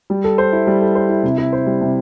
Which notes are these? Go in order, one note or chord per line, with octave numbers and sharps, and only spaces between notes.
G3
A4
C5
E4
G3
A4
C5
E4
C3
E4
C5
G3
C3